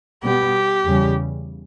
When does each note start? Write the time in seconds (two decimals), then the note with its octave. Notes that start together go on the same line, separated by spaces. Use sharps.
0.24 B2 G3 B3 G4
0.85 E2 C#3 G3 C#4